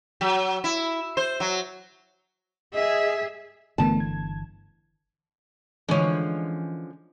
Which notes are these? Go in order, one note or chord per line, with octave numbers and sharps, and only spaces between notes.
F#3
E4
C5
F#3
G#4 D#5 E5
G1 D3 E3 A3 B3 A#4 A5
G#6
D3 E3 F3 G#3 C#4